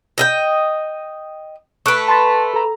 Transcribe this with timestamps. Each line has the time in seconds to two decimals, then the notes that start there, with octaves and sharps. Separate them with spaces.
0.18 D#5 E5 G5
1.86 A3 B4 C#6 F#6 D7
2.08 A5 C6 A6
2.54 A4 A#5